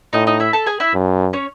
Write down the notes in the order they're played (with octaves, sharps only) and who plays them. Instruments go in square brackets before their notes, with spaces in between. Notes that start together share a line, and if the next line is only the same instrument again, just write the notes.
[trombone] A2 [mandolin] D#4 D#5
[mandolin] D#4 D#5
E4 E5
A4 A5
G#4 G#5
E4 E5
[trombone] F#2
[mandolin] C#4 C#5